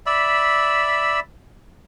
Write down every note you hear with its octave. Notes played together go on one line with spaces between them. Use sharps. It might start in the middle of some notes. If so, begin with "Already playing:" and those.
D5 E5 B5 E6